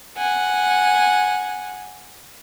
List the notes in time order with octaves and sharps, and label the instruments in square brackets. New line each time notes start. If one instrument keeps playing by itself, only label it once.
[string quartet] F#5 G#5